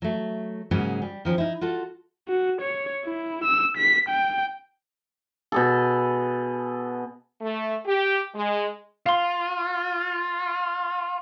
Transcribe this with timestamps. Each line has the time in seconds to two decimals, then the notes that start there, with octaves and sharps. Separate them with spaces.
0.02 F#3 A3
0.71 G#2 C#3 F#3 A#3 C#4 G#4
1.02 G3
1.25 D#3 F3 G3 C#4
1.38 D#4 E4
1.61 F4 F#4 A4
2.28 F#4
2.61 C#5
3.05 E4
3.44 E6
3.77 B6
4.09 G5
5.52 B2 G#4 A4
7.41 A3
7.86 G4
8.34 G#3
9.06 F4 F5 C6